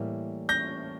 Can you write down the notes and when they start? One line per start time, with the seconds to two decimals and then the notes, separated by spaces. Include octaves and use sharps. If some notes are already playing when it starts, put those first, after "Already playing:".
Already playing: A2 E3 G3 A#3 E4
0.49 G6 A#6